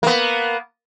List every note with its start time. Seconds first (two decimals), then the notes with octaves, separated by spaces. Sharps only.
0.03 A#3 B3